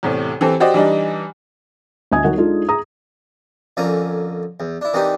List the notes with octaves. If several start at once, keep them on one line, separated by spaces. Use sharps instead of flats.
E2 A2 C3
E3 C4 G4 A4
F#4 G4 C5 D5 D#5
E3 G3 D4 D#4
D2 D#5 G#5 D#6 G#6
F#3 D#4 F#4 A#4 F#5
G#3 D4 D#4 F4 A4
G#4 A#5 D#6
F2 D3 A#3 C#4 G#5 A#5
E2
D4 E4
E3 A#3 C4 D4 D#4 G4